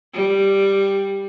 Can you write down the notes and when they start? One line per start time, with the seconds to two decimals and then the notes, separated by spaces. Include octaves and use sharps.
0.14 G3